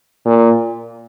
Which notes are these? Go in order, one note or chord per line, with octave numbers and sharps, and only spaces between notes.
A#2